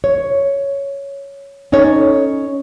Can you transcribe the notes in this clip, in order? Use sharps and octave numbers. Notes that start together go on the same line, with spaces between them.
C#5
C#4 D#4 A4 C#5